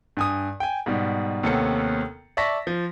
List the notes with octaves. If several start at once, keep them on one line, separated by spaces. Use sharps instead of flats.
G2 G#5 D#6
G5 G#5
G#2 B2 G3
D#2 C3 B3 C#4 A4 C#7
D5 E5 A5 C#6 A#6 B6
F3